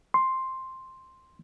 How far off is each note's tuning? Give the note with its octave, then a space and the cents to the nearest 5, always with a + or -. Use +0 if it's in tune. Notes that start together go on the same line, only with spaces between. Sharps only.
C6 +5